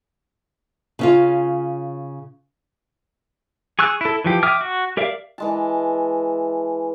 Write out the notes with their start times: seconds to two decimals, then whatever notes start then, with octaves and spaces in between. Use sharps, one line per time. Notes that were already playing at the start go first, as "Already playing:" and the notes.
0.99 C#3 C#4 F4
3.79 G#4 C#6 E6 F#6
4.01 E4 A4
4.24 E3 F3 G4
4.43 E5 G5 D6 D#6 F6
4.61 F#4
4.97 G4 A#4 D5 E5 F5
5.38 E3 G#3 A5